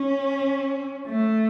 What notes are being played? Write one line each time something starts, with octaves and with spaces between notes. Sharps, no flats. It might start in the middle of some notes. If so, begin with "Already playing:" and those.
Already playing: C#4
A3